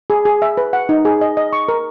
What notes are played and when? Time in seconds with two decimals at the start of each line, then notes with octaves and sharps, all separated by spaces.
0.10 G#4
0.25 G#4
0.42 E5
0.57 B4
0.73 F#5
0.89 D#4
1.05 G#4
1.21 D#5
1.37 D#5
1.53 C#6
1.69 A#4